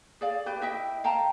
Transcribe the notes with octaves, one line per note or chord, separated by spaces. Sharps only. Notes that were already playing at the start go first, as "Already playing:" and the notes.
G#4 D5 F5
G4 B4
E4 D#5 E5 G5
F5 G5 A5 A#5